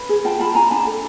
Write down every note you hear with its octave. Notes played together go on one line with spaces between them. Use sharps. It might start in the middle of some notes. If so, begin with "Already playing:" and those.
Already playing: B4
G#4
F4 G5 A5
F4 A5 B5
F4 G#5 A#5
D4 A5 B5
A4